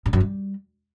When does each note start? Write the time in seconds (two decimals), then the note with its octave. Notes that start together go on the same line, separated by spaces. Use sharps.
0.06 G2
0.13 F#2
0.20 G3